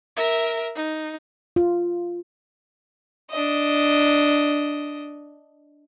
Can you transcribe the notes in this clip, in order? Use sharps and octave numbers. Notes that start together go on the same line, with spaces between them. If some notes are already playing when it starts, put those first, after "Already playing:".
A#4 E5
D#4
F4
D4 D#5